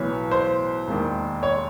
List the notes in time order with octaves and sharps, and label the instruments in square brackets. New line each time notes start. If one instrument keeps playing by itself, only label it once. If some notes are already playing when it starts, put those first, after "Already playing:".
Already playing: [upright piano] B1 A2 E3 C#5
C5
E1 D#2 D#3
C#5